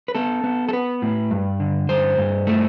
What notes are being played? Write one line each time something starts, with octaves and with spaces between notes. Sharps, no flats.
B4
B3 A4
B3
A4
B3 B4
A2
G2
D3
G2 C5
G2
A3